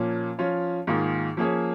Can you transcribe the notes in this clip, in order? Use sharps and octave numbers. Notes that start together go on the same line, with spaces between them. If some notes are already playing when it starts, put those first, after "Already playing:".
Already playing: A#2 F3 A#3 C#4
F3 C#4 F4 C#5
G#2 D#3 A#3 F4 G#4
F3 A#3 C#4 G#4 C#5